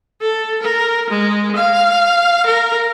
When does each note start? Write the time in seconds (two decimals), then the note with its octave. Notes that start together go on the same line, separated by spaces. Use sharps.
0.21 A4
0.61 A#4
1.10 G#3
1.56 F5
2.46 A#4